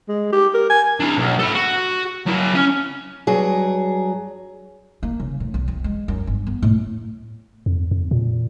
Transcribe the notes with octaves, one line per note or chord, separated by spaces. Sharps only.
G#3
G4
A#4
G#5
D4 E4
B1
A4 B5
F#4
F#3 E4
C#4
G2 F#3 G#4
A#3
C#3
A2
B1
F2
G#3
F#2
G1
B3
A2
F2
F2
A#2